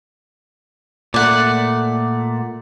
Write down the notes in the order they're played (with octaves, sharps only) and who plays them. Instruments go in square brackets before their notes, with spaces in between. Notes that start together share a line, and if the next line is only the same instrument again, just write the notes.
[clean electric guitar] A#2 A3 [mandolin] D5 F#5